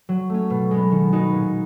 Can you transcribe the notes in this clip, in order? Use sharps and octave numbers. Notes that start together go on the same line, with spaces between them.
F#3
A3 C#4
B2
G#3 B3
D#3
G#3 B3 D#4 F#4
A#2